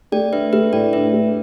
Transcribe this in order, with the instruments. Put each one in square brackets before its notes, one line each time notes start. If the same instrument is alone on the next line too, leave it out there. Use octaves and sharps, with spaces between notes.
[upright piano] A3 [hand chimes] D5 G5
[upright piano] D4 [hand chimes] B4 E5
[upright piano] A3 [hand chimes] B4 E5
[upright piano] A2 [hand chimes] D5 G5
[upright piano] D4 [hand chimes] B4 E5
[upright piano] A3